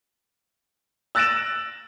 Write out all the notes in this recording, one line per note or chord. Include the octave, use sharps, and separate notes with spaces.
E6 F#6 A6 A#6 D7 E7